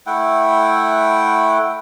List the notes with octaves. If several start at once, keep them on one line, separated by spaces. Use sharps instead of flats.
A3 E4 F#5 G5